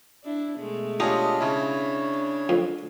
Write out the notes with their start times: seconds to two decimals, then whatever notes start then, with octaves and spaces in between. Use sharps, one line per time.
0.24 D4 E4
0.57 B2 G#3 A3
1.00 D4 D#4 F4 G4 G#4 C#5 D#5
1.41 C#3 D4 E4 C#5
2.49 F2